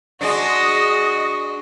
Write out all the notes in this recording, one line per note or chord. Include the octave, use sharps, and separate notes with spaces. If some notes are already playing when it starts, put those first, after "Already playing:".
G#3 D4 F#4 D#5